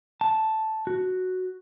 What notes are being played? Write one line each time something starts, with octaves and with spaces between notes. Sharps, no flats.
A5
F#4